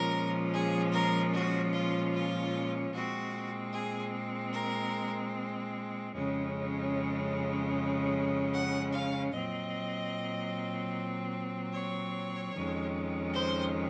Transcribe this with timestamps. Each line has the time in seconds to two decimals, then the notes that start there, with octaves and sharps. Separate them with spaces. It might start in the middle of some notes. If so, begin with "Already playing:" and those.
Already playing: A#2 F3 G#3 C#4 A#4
0.53 G#4
0.93 A#4
1.33 F#4
1.73 F4
2.13 F4
2.93 A#2 G#3 C4 F#4
3.73 G#4
4.53 A#4
6.13 F2 C#3 G#3 C#4
8.53 F#5
8.93 F5
9.33 A#2 F#3 C4 D#5
11.73 C#5
12.53 F2 D#3 G#3 C#4
13.33 C5